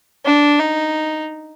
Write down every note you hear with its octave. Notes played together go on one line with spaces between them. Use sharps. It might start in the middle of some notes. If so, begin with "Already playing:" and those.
D4
D#4